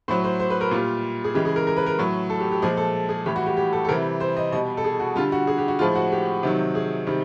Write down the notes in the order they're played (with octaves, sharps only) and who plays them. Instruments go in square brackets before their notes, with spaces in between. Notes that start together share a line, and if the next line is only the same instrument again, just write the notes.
[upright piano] A2 F#3 C5
C5
C5
B4
A#4
A#2 G3 F4
G#4
C#3 E3 G#3 G4
G#4
A#4
A#4
B4
A#4
A2 F#3
A4
G4
G4
A#2 F3 G#3 G#4
A4
G#4
A2 E3 G3 G4
F#4
G4
G4
A4
A4
C3 E3 G3 A#4
C5
D#5
B2 G3 D#5
A4
G#4
F#4
D3 G3 F4
F#4
G#4
G4
F#4
A2 F3 G#3 F4
F#4
G4
C3 D#3 F#3
G#4
C3 D#3 G3